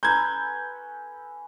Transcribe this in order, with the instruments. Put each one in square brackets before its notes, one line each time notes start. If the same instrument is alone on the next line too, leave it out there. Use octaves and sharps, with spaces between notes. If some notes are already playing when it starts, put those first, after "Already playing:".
[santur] C#4 A4 B4 [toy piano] A#5 C6 [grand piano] G6 G#6